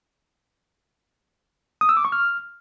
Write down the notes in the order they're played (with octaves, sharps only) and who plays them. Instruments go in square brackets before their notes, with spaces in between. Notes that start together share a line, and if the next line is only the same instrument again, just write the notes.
[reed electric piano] D#6
E6
D6
C#6
F6